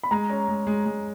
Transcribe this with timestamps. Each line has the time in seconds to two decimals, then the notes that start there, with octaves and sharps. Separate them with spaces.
0.03 B5
0.11 G#3 A#5
0.30 C#4
0.48 G#3
0.67 G#3
0.86 G#3